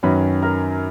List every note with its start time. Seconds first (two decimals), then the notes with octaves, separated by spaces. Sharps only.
0.03 F#2 D#3 F#3 C#4 B4 B5
0.42 A#4 A#5